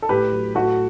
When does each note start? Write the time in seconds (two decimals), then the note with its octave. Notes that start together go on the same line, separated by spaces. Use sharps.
0.02 A4
0.09 A2 G4 B4
0.32 F#3
0.55 A2 F#4 A4